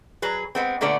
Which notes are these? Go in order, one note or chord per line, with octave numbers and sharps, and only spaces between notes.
F#3 G#4 B4
G#3 B3 C4
A#2 D3 A3 B3 D5